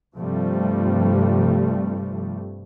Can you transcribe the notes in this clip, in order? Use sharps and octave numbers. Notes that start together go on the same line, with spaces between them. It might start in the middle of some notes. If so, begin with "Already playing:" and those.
G2 C3 F3 G3 A3